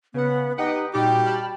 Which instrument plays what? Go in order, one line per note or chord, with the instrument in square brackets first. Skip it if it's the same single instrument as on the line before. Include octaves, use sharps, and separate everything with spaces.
[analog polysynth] C#3 F#5 [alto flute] B3
[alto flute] D#4 [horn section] G4 F#5 [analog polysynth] B4 D#5 G5
[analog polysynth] A#2 D#4 D6 [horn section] G3 F#4 G4 [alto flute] G5
[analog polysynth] A5 B5 F6